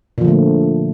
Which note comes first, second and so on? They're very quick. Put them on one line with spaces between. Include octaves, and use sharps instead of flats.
A#2 F3 D3 A3